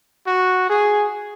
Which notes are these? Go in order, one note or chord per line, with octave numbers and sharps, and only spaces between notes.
F#4
G#4